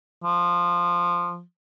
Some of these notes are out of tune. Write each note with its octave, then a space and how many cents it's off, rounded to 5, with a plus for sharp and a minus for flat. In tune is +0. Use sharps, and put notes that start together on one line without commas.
F3 +0